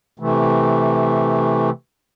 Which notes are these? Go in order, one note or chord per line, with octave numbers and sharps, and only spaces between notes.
C3 E3 A3